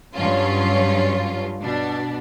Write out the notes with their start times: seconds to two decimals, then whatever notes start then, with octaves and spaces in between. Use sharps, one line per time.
0.15 G2 F#3 C#4 F4
1.61 B2 D4